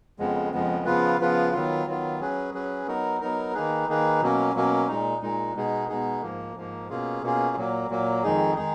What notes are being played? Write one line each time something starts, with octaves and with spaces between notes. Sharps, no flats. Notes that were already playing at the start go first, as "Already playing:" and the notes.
F2 C#3 F3 G#3 B3
F2 C#3 F3 G#3 B3
C#3 F3 B3 F4 B4
C#3 F3 B3 F4 B4
D#3 F#3 B3 F4
D#3 F#3 B3 F4
F#3 C#4 G#4 B4
F#3 C#4 G#4 B4
F#3 B3 D#4 A#4
F#3 B3 D#4 A#4
D#3 A#3 D#4 G#4 B4
D#3 A#3 D#4 G#4 B4
B2 F#3 A#3 C#4
B2 F#3 A#3 C#4
A#2 G#3 D#4
A#2 G#3 D#4
B2 G#3 B3 D#4 G#4
B2 G#3 B3 D#4 G#4
G#2 F3 A#3
G#2 F3 A#3
B2 A#3 C#4 F4 G#4
B2 A#3 C#4 F4 G#4
A#2 F#3 A#3
A#2 F#3 A#3
F2 D#3 G#3 D#4 G#4
D#3 G#3 D#4 G#4